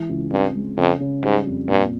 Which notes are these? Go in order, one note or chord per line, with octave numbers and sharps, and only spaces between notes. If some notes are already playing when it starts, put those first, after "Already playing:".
Already playing: E3 G#3
C#2
G2 C4
G#3
F2 C#3
C#3
G#2 G3
F2
G2 A#2